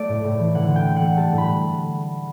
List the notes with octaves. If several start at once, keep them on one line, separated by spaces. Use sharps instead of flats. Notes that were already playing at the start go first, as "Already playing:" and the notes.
Already playing: A3 D5
A2
A2
E3
D3 F#5
D3
G5
A3
F#5
A3
G3 A5
A2
B5